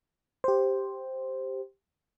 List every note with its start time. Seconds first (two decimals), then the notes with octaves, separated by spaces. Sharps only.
0.44 G4 C5